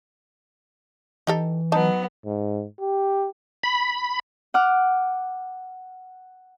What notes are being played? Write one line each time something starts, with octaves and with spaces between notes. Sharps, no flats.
E3 D#4 G4 A4
F#3 B3 D#4 A5
G#2
G4
B5
F#5 D6 F6